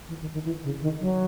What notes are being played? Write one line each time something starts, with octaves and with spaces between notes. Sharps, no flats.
E3
D#3
D#3
E3
C#3
D#3
F#3